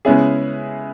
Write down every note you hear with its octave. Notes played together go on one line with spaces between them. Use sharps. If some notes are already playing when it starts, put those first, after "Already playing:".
C#3 G#3 B3 C#4 E4 G#4